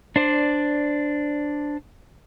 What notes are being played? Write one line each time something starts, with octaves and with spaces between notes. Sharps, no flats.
D4 C5 D5